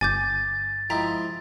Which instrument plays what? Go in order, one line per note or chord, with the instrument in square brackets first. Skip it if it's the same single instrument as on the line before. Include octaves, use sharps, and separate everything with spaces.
[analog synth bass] G1 [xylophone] G#5 D6 G6 [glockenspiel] A6
[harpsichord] F3 G#3 E4 [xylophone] G5 A#5 B6